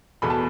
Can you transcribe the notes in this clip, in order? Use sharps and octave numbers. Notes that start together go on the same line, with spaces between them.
E2 B2 A3 B5
A5